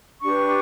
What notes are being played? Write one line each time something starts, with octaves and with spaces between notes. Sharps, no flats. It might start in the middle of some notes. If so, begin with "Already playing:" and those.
D4 G4 B4 C#6